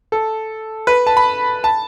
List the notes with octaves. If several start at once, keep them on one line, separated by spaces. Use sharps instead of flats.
A4
B4
A5
B5
A5